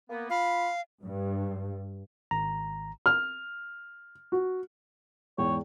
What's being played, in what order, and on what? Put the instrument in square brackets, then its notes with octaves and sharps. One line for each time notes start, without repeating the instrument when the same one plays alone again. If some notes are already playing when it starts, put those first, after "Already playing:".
[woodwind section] A#3 B3
[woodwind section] F4 B5 [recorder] F5
[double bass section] G2
[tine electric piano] G#1 A#5
[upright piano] F6
F#4
[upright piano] E2 G#2 G5 [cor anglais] C#5